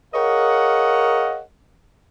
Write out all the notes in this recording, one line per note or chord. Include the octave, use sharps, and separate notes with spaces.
G#4 A#4 C#5 D#5 F5 F#5